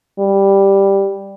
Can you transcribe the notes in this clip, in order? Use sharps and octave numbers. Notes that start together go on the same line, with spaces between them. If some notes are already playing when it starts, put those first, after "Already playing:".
G3